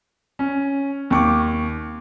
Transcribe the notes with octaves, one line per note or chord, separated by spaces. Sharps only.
C#4
D#2 C#6 D6